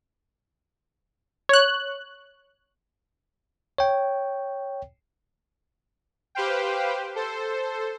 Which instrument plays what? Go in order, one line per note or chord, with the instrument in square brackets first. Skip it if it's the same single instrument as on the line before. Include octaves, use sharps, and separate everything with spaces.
[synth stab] C#5 F#6
[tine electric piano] C#5 G5
[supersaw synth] G4 B4 C5 F5 G5
A4 C5